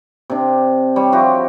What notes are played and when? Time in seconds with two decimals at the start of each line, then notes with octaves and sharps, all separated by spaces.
0.30 C3 D4
0.96 G3 C#5
1.12 F3 E4 F#4 G4